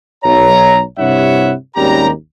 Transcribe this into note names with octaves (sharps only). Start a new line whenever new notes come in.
B1 C#5 A#5
G2 C3 E4 C#5 E5 F#5
G#1 D#2 G3 C#4 G4 A#5